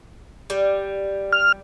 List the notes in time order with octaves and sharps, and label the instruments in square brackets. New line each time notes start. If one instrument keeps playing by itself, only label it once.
[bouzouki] G3
[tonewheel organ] F6